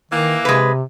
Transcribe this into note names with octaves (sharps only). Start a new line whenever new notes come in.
D#3 E3 A#3
C3 G#3 B4